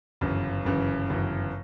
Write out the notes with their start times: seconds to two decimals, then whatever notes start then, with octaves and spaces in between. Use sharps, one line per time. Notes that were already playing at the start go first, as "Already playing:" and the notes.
0.21 G1 F#2 C#3 E3
0.64 G1 F#2 C#3 E3
1.09 G1 F#2 C#3 E3